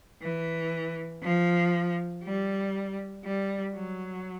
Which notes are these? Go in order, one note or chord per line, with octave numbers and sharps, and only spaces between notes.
E3
F3
G3
G3
F#3